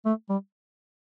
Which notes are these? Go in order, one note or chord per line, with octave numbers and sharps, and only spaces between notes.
A3
G3